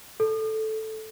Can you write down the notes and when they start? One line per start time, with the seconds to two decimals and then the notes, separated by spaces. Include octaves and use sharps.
0.20 A4